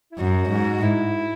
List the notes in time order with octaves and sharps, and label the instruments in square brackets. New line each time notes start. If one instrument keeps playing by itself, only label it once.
[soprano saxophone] E4
[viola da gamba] F#2 [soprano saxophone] F#4
[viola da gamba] G#2
[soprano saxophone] E4